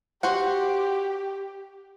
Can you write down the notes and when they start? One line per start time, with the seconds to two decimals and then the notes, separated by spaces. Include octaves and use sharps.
0.23 F#4 G4 C5 F#5